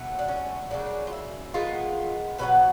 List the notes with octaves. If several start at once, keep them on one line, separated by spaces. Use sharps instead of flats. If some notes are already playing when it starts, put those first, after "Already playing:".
Already playing: B2 F#3 A3
D4
C#4
C#3 F#3 A#3 D4
F4
E4
D#3 G#3 B3 F4
B2 F#3 B3 B4